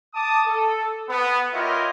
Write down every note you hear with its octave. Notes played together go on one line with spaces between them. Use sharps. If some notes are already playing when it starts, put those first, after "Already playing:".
A5 D6 D#6
A4
B3
E4 F4 G4 A#4 C#5 D#5